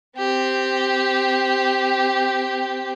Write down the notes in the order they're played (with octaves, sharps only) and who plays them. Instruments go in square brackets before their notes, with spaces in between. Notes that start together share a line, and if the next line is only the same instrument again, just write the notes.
[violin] C4 G4